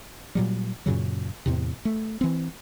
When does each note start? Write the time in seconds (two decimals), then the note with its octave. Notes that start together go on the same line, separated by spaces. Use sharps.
0.35 A#2 F#3 G3
0.86 F#2 A#2 C#3 F#3
1.46 E2 A2 C3
1.85 A3
2.21 E3 C4